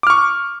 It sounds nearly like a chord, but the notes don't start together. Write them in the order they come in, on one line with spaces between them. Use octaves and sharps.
D6 F6 C#6